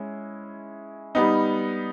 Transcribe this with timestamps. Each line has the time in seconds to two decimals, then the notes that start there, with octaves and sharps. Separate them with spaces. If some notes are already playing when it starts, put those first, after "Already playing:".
Already playing: G#3 C#4 E4
1.15 G3 B3 D#4